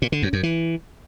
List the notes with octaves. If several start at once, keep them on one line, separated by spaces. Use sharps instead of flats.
A#2
D3
F#2
F#2
E3